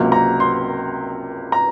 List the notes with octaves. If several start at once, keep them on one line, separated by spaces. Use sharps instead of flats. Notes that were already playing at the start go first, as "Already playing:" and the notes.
Already playing: C#2 C3 F#3 A#3
A#5
C6
A#5